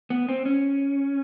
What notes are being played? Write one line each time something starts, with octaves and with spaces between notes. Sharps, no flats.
B3
C4
C#4